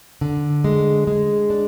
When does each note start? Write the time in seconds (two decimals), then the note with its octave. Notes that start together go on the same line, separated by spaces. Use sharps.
0.21 D3
0.64 G#3
1.07 G#3
1.50 D4